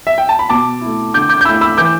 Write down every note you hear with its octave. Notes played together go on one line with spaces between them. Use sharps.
E5
G5
A5
B5
B2 A5 D6
A3 E4
D3 D6 G6
D6 G6
G6
A3 E4 B5 E6
B5 E6
E3 D6 G6